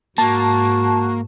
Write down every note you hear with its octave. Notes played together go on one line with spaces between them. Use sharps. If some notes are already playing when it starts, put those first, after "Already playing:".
G#2 A#3 F#4 A5